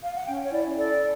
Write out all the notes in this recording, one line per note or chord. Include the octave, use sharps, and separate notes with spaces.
F5
F#5
C#4 G5
C#5
E4 D5
A4 D5